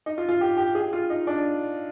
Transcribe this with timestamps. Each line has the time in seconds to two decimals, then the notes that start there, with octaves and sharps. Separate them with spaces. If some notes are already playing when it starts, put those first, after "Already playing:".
0.06 D#4
0.18 F4
0.29 F4
0.41 G4
0.57 G4
0.75 G#4
0.93 F4
1.10 D#4
1.27 D4